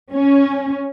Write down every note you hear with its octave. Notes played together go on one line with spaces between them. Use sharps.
C#4